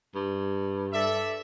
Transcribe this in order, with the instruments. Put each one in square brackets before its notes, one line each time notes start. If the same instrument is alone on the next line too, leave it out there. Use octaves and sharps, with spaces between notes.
[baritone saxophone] G2
[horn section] A4 D5 E5